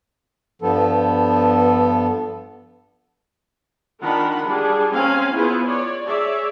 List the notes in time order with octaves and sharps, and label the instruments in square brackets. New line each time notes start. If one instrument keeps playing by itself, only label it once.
[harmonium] G2 F3 B3 A4
[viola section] D#3 D4 F4 A#4 F#5 B5
G3 D4 G#4
A#3 C4 C#4 F5 G#5
B3 E4 F4 G#4 B4 C5
C#5 D5
G#4 C#5 D5 E5